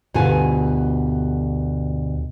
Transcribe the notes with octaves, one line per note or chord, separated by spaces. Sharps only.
D2 G2 B2 F4 A4 G#5